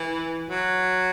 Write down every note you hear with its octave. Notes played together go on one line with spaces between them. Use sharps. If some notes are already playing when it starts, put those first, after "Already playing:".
Already playing: E3
F#3